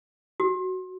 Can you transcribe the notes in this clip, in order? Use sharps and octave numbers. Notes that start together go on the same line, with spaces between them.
F#4